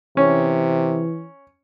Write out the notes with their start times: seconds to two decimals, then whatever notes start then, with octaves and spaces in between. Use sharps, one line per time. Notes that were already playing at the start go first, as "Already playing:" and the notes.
0.17 C3 E3 C#4